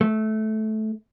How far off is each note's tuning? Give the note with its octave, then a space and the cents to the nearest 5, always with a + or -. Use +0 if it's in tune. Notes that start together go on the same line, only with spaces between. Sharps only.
A3 -15